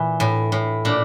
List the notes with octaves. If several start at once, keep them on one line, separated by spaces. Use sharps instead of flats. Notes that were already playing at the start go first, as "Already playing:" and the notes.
Already playing: A#2 E3
A2
A2
A#2 D4